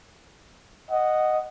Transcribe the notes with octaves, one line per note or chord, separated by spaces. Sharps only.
D#5 F#5